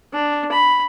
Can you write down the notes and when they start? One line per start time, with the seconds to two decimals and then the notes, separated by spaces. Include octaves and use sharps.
0.13 D4
0.51 B5